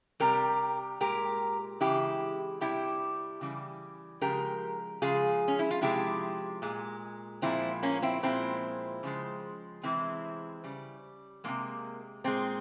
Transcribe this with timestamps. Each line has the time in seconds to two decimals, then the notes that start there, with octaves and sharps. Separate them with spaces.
0.20 C3 G3 G4 A#4
1.00 A#2 G#3 G4 A#4
1.80 C#3 E3 G#3 E4 G4
2.61 C3 G3 E4 G4
3.41 C#3 E3 G3
4.21 C#3 F3 G#3 G4 A#4
5.02 C#3 F3 G#3 F4 G#4
5.48 C#4
5.59 E4
5.71 F4
5.81 C3 F3 G#3 E4 G4
6.62 A#2 G#3
7.42 A#2 F3 G#3 C4 E4
7.83 A#3 C#4
8.02 C4 E4
8.23 A#2 F3 G#3 C4 E4
9.03 C#3 F3 G#3
9.83 C3 E3 G#3 C4 E4
10.64 C#3 G3
11.44 C3 F3 G#3 A#3
12.24 A#2 G#3 C4